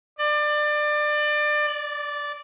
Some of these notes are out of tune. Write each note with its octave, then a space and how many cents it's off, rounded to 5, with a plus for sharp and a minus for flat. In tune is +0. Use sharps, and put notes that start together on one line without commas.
D5 +25
D5 -10